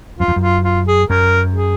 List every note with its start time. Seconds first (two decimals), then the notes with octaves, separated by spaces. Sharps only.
0.19 F#2 F4
0.28 F2
0.36 F#2
0.42 F4
0.64 F4
0.87 G#4
1.09 F#2 A#4
1.54 G#4